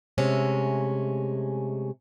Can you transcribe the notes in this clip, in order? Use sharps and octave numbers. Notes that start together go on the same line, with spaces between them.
C3 G#3 A3 C#4